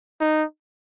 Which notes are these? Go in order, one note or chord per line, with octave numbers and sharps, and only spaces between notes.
D#4